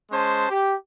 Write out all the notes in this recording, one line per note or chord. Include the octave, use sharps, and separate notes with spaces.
G#3 C#4 C5 A5
G4